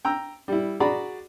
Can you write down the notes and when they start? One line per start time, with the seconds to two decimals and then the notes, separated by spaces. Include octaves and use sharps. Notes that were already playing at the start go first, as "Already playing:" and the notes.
0.05 G5 A#5 E6
0.48 G3 E4
0.80 F#4 G#4 D5 A#5 B5